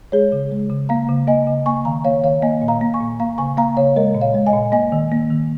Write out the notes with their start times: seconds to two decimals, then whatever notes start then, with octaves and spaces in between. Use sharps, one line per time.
0.12 G#3 G#4 C#5
0.32 C#3
0.52 G#3
0.70 C#3
0.89 A#3 F5 A#5
1.09 C#3
1.27 A#3 D#5 G#5
1.47 C#3
1.66 A#3 G#5 C#6
1.85 D#3 F5 A#5
2.04 A#3 C#5 F5
2.23 D#3 C#5 F5
2.42 A#3 D#5 G#5
2.62 A#2
2.68 F5 A#5
2.81 A#3
2.94 G#5 C#6
3.01 A#2
3.20 A#3 F5 A#5
3.38 C#3 G#5 C#6
3.57 A#3 F5 A#5
3.77 C#3 C#5 F5
3.96 G#3 A#4 D#5
4.15 A#2
4.21 C#5 F5
4.34 G#3
4.47 D#5 G#5
4.53 A#2
4.72 A#3 D#5 G#5
4.92 D#3
5.12 A#3
5.30 D#3